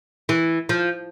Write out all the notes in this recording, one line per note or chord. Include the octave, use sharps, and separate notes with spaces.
E3
F3